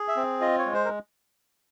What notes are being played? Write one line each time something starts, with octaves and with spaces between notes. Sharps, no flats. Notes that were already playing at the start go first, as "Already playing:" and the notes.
Already playing: G#4
E5
C4
F4 D#5
C#5
G#3
C5
A#4